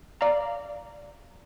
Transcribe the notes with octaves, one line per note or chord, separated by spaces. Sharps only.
D5 F5 A#5